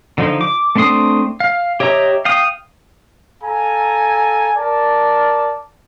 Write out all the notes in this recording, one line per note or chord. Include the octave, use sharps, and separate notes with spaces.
D3 F3 D#4
D6
A3 C4 D4 C6 D#6
F5
G4 C#5 D#5 E5 A#5
F5 G5 D#6
A4 F5 G#5 A#5
A#4 D5 A5